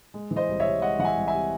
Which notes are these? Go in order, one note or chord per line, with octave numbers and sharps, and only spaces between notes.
G#3
E3
C5 D#5
C2
C#5 E5
C3
G#3 D#5 F#5
E3 F#5
E5 G#5
C2
E5 G#5
C3